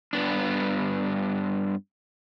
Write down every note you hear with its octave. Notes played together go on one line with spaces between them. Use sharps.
G2 B3 D4